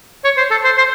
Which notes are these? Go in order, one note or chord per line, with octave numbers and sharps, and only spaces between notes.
C#5
C5
A4
C5
C5